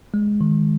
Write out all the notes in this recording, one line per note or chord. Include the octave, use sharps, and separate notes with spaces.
G#3
D#3